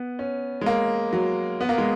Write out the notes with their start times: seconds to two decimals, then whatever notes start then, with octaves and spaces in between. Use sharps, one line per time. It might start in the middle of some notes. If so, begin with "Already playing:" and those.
Already playing: B3
0.19 C#4
0.61 G#3
0.66 A#3
1.13 F#3
1.61 B3
1.69 A#3
1.78 G#3